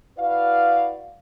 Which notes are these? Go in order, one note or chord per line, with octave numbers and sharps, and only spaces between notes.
E4 F#4 B4 D5 F5